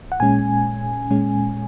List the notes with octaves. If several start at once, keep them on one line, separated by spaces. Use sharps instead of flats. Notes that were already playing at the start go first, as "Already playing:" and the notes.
F#5
A#2 G#3 C#4 G#5
A#2 G#3 C#4